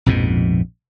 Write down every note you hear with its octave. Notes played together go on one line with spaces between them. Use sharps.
A#1 F2 G#2 B2